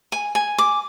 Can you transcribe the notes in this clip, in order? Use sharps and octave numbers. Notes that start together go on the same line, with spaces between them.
G#5
G#5
D6